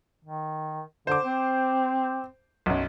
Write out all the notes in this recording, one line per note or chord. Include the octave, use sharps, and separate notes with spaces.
D#3
D3 C5 D6
C4
B1 F#2